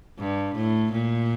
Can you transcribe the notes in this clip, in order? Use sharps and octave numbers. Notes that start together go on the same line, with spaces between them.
G2
A2
A#2